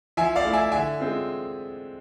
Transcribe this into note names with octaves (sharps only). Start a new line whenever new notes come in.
F3 E5 G#5
D5 F5
A3 E4
E5 G#5
D3 E5 G#5
G#3 C4 F4